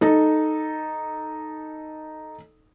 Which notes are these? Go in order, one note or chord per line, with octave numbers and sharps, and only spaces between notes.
D#4 A4